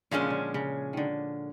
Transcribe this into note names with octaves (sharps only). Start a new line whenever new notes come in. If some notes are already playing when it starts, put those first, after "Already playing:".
A#2 D3 F3 G#3 C#4
C#3
D3
C#3
D3 D#3